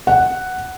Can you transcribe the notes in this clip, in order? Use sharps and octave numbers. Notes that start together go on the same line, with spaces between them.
F#5